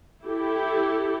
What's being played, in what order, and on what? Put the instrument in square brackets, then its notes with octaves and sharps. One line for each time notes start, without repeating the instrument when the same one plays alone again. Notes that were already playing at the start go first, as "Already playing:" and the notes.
[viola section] E4 G4 A4